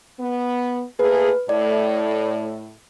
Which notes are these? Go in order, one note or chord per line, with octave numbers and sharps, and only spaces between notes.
B3
A3 A#3 G#4 B4
A2 D5